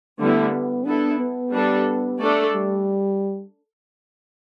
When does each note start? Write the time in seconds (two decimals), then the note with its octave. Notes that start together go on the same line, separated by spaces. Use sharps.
0.19 D3 G3 A3 B3 E4
0.53 B3
0.85 B3 D4 E4 A4
1.20 B3
1.52 G3 D4 A4
2.20 A3 D4 A4 D5
2.54 G3